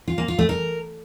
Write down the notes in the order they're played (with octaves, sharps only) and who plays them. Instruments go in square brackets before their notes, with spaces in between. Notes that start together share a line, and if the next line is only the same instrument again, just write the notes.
[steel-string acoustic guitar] F4
A#3
F4
A3
A#4